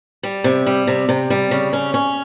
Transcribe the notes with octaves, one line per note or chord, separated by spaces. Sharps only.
G3
C3
G3
C3
C3
G3
C#3
C#4
C#4